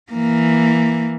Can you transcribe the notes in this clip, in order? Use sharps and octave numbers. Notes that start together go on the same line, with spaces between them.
E3 A#3